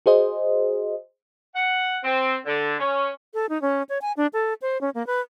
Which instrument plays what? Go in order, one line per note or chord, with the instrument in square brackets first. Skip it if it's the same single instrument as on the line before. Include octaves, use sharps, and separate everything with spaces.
[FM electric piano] F#4 G#4 C5 D#5
[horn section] F#5
C4
D3
C#4
[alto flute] A4
D#4
C#4
C#5
G#5
D4
A4
C5
C#4
A#3
B4